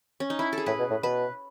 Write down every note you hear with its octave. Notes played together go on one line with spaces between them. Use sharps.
C#4
D#4
E4
A4
G#4
A2 B4
B2
A2
B2 B4